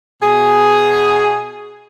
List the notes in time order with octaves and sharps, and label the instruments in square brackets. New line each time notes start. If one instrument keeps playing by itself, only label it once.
[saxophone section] B2 G#4